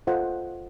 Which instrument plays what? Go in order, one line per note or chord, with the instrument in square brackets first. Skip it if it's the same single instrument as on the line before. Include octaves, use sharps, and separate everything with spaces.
[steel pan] F4 A4 C5 D#5 F#5